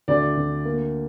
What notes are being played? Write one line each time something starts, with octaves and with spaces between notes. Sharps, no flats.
D2 D5
D2
A#3